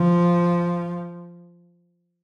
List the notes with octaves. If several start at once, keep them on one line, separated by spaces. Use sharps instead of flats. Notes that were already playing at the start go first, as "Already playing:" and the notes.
Already playing: F3